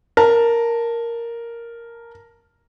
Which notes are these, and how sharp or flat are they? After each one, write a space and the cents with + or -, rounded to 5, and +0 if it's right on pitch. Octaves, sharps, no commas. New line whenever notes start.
A#4 +0 A5 +10